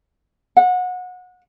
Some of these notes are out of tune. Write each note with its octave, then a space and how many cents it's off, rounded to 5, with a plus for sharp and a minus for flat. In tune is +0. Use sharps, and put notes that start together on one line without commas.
F#5 -25